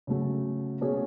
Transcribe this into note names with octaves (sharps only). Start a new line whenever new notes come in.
C#3 F#3 A3
B2 A3 C#4 G#4